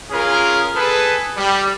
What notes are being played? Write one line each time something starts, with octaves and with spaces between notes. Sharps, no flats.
C#4 F4 G#4 A#4
G#4 A4 B4
G3